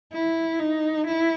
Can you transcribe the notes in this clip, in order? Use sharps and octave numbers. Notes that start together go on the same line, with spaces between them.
E4
D#4
E4